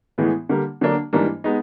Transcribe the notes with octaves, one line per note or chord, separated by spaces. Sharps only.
A2 E3 G#3 B3
D3 G3 A#3
D3 F#3 A#3 D4
G#2 E3 G3 A#3 D4
G#3 B3 D#4